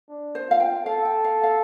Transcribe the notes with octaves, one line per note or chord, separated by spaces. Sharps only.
D4
C5
F4 F5
G5
A4 F5
G5
F5
F5